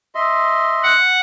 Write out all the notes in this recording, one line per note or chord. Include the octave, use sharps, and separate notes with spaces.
D#5 E5 C6
F#5